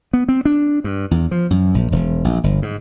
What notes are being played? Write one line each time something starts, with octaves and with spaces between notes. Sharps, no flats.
B3
C4
D4
G2
E2
F3
F#2
A#1
E1
A#1
G1
G#2